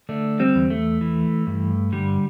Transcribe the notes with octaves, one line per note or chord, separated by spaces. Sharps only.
D3 A3 D4
G3 C4
E2
A3
E3
G2
D3 G3